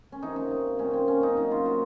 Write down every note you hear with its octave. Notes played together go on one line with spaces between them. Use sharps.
C#4
C3 F3 A#3 D#4
D#4
D#4
A#2 F#3 C4 C#4
C4
C#4
D#4
A#2 F#3 A#3 D#4
F4
F#4